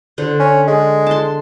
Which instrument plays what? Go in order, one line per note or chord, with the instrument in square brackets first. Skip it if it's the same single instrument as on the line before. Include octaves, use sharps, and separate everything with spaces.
[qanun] D3 C5
[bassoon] C#4
G#3
[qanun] A5 C6